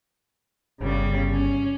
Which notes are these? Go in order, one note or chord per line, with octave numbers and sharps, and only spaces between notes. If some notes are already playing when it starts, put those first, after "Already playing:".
G1 C#3 G3
C#4